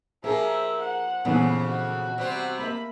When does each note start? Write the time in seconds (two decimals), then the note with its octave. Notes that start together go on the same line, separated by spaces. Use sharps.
0.24 F3 A#3 G4 G#4 A#4 E5
0.80 F#5
1.25 F2 A#2 C#3 E3 B3
1.66 F#4
2.18 C3 G3 C4
2.59 A3 A#3 E5 B5